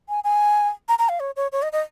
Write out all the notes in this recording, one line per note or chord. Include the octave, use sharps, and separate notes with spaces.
G#5
G#5
A#5
A#5
F5
C#5
C#5
C#5
D#5
D#5